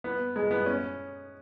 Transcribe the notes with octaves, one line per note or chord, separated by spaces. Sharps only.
B3
G#3
B3
C#4